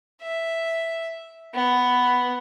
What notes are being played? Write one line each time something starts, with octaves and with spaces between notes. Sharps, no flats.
E5
B3